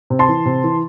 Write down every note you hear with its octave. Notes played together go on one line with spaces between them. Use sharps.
C3
A5 C6
E3
C3
E3